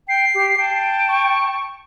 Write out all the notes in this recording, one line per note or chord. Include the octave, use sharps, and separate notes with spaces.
G5 C7
G4
G5 A5
C#6